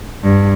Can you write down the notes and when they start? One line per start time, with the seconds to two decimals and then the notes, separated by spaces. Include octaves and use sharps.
0.23 G2